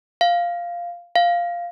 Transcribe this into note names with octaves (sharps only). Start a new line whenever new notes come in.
F5
F5